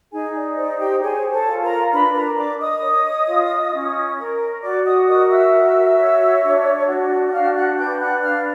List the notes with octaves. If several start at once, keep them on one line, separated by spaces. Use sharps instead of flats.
D#4 G#4 G#5
D5
C5 D5
G4 G5
G#4 C#5 G#5
A4 A5
F4
A#4 A#5
D4 B4 B5
A#4 A#5
A#4 D5 D6
D#5 D#6
C#5
F4
C#4
A#4
F#4 D5 D6
D#5 D#6
A#4 D#5 D#6
E5 E6
F#4
C#5
D4
F#4
D4 F5 F6
F#5 F#6
B4 G5 G6
F#5 F#6
D4 F5 F6